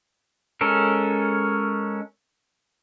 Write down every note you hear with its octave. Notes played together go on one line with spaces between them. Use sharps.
G#3 C#4 A4 A#4